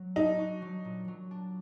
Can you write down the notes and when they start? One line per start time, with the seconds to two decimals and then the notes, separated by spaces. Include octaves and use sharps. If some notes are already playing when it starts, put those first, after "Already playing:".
Already playing: F#3
0.16 D4 D#4
0.39 F#4
0.62 F#3
0.85 A#2
1.08 F#3
1.31 D4